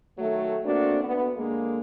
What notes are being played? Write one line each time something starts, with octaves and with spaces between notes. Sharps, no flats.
D#3 F#3 A3
A3 A#3 C4 D4 F#4
D2 D3 B3
D3 G#3 A#3